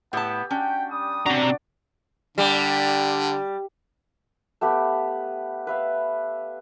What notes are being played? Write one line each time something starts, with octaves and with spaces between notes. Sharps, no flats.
A2 B3 G4 A5
C#4 D4 F#4 G5
G3 D#6
C3 D4 F#4 D5 A#5
D3 G3
A3 B3 G4 B4
B4 E5 F5